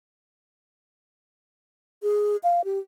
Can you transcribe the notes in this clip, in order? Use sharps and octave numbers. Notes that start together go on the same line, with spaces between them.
G#4
F5
G4